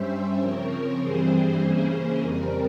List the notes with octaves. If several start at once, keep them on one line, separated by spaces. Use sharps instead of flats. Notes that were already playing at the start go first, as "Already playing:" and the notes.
Already playing: G2 G3 C#4 C5 E5
C5 E5
C#3 F3 C4 A#4 C#5
A#4 C#5
G2 E3 G3 C4 G#4 C5
C#3 E3 A#3 C#4
G#4
F2 C#3 G3 C4 A#4